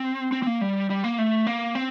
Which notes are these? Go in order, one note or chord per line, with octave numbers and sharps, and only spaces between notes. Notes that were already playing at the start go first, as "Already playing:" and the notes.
Already playing: C4
C4
C4
A#3
G3
G3
A#3
A3
A#3
C4